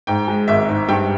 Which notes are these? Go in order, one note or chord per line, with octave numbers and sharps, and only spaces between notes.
G#2 G5
G#3
G#1 E5
G#2
G2 G5